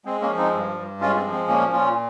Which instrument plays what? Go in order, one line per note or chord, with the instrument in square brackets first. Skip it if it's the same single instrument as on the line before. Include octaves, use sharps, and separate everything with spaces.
[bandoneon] G#3 C4
A#3 C#4
F3
C4 D#4
G2
G2
G#3 C#4 F4
C4
F3
C4
A#2 A#3 C#4
A#2 C#4 F4